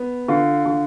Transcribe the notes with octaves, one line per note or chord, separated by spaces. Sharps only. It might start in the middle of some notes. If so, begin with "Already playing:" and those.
Already playing: B3
D3 F4
D3